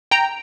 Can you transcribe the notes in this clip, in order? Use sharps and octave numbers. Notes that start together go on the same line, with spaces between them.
G5 A#5